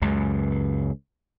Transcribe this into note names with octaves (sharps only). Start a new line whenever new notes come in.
C#2 F#2 C#3